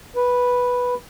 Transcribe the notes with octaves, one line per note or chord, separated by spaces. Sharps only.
B4